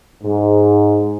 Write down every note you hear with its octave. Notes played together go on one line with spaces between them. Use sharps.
G#2